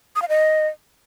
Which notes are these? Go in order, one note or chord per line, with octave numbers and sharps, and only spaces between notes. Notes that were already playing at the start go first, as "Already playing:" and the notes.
D#6
F5
D#5